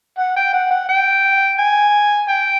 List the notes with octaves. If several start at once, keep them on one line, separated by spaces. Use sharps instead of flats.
F#5
G5
F#5
F#5
G5
G#5
G5